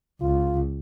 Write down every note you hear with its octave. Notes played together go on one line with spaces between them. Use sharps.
C#2 F4